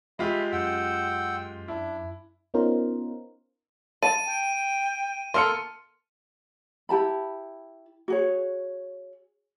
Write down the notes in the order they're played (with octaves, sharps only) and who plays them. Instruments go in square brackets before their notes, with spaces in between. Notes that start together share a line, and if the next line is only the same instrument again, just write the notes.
[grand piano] G#3 F4 G4 [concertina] E5 B5
[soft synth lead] F#2 [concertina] F#5 G5 E6
[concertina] D4 [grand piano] E4
[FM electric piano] B3 C#4 D#4 F4 A#4 C5
[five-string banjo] A5 [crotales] D#7
[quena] G5
[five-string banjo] A#3 A4 [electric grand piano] C6 F6 C#7
[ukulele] E4 G4 A5 B5
F#4 G#4 C#5